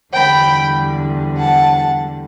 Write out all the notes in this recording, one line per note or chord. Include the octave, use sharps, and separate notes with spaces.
E2 D3 G3 G5 B5
F#5 A5